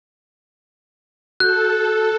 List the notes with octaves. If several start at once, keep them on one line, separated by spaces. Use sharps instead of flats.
F#4 A4 F#6 G6